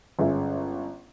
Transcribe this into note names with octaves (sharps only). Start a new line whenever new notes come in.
G1 G#3 C#4 E5